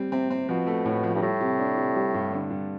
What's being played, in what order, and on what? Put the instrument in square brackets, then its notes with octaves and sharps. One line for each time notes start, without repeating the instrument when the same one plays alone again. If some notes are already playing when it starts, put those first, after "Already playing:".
Already playing: [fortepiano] G3 C4
[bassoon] C3 [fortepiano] C4
[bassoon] C3 [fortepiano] C4
[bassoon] B2 [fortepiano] F3
[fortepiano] A3
A2
F3
[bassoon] G2
[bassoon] A2 [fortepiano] G3
[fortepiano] C3
D4
C3
G3
G2
D3
G2